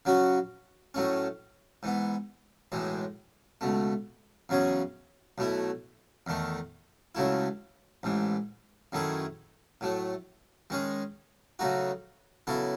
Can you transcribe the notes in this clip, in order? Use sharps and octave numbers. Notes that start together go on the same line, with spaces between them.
C#3 F#3 C#4 F#4
A2 F#3 A3 C#4
G#2 E3 B3
B1 A2 E3 G#3
C#2 B2 A3
E2 C#3 F#3 C#4 G#4
B1 B2 A3 E4
E2 D#3 A3
C#2 C#3 F#3 A3 E4
A1 G#2 E3
F#2 D#3 A3 E4 G#4
A2 F#3 A3
D#3 G#3 C#4 G#4
C#3 F#3 A3 D#4 F#4
C#3 F#3 B3 E4 A4